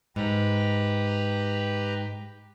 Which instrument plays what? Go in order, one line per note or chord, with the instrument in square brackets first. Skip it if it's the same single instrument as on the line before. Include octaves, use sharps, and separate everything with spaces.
[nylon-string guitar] G#2 [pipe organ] G4 B4 A#5